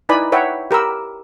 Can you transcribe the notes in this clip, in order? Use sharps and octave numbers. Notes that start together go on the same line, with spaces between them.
D#4 E4 B4 D5 G#5 B5
B4 C#5 E5 F#5 G5
G4 A#4 B5 E6